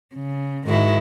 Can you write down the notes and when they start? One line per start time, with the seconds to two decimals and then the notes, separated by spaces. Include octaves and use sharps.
0.14 C#3
0.67 G#2 D#3 G#3 E4 F#4